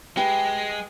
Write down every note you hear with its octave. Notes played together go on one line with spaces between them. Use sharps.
G#3 G4 B4 G5